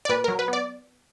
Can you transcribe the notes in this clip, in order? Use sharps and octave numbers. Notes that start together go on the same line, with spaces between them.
D5
A#2 B4
F#3 A#4
B4
B3 D5